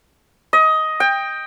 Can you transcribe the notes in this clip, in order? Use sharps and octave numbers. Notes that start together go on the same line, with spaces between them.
D#5
G5